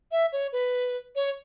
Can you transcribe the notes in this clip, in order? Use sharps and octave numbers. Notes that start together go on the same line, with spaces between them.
E5
C#5
B4
C#5